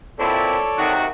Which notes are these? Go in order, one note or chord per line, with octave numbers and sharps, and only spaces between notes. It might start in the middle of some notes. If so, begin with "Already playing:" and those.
A#2 C4 E4 A4 C#5 D5
C3 D#3 F#4